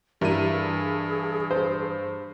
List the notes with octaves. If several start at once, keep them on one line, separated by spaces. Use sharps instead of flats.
G2 E3 G3 E4 G#4 A#4 D#7
C5